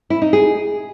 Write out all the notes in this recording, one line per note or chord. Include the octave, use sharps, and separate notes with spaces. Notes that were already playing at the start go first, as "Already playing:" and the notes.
E4
D#4
G#4